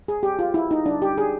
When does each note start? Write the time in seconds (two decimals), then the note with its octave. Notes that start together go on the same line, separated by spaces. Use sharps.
0.08 G#4
0.23 G4
0.39 F4
0.54 E4
0.71 D#4
0.86 D4
1.02 G4
1.18 G#4